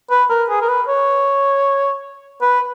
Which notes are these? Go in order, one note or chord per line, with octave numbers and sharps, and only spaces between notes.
B4
A#4
G#4
A#4
B4
C#5
B4